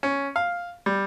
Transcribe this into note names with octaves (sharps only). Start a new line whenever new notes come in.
C#4
F5
G3